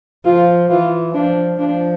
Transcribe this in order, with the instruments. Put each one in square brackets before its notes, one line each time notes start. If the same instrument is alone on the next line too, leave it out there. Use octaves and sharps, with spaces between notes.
[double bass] F3 [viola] F4
[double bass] E3 [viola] F4
[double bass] F3 [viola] D4
[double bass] F3 [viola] D4